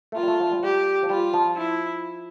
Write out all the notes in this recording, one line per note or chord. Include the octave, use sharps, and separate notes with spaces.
A3
A#3 F4
G3
A3
F3
G3
G3 G4
F3
G3 F4
F3
E4